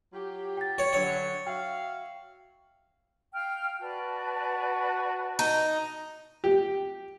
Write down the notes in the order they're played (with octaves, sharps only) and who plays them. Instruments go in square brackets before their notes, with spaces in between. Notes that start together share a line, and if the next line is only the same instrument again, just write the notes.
[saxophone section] F#3 F4 G4
[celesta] G5 A6
[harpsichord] C#5
[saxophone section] D3 F#3 [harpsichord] C#5
[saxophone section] F#4 E5 F5 [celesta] G5
[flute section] F5 G5 F6
[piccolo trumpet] F#4 [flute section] B4 D5 A5
[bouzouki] D#4
[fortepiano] G4